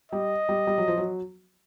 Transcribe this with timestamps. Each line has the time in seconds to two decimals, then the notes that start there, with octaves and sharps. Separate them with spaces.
0.12 G3 D#5
0.49 G3
0.67 G3
0.78 F#3
0.88 F3
0.98 F#3